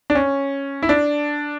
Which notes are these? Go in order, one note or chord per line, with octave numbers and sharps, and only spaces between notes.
D4
C#4
E4
D4